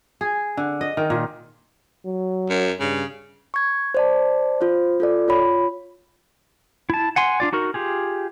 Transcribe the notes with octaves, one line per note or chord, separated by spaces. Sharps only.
G#4
D3
D#5
D#3
A#2
F#3
F#2
G2 C#3
C#6 G#6
C5 D5 A5
F4 C5
F4 A4 D5
F4 C#5 B5
E4 A5
F#5 G#5 C6
D4 F4 D5
D#4 F#4 A#4
F4 G4 G#4